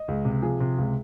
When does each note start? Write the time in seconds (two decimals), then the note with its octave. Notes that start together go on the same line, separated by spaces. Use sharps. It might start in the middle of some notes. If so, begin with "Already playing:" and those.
Already playing: D#5
0.08 C#2
0.25 C3
0.42 F3 G#4
0.60 C3
0.78 C#2